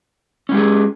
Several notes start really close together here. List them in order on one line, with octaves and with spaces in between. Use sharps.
C#4 G#3 G4 G#4